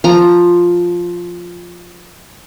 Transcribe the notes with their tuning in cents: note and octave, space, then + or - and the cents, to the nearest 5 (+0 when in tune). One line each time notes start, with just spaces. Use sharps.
F3 +5 A#5 +0